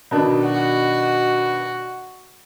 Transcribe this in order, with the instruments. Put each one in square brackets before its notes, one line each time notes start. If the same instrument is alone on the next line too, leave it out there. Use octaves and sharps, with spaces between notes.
[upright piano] B2 D#3 D4
[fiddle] F#4